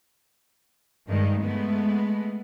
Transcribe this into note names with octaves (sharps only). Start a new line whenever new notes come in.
G2 D#3 G#3
G#3 A3 B3